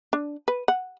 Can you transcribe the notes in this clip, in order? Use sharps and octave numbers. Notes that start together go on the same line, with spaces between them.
D4
B4
F#5